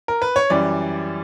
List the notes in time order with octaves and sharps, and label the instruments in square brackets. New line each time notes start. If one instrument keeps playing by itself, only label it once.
[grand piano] A#4
B4
C#5
F#2 E3 G3 D5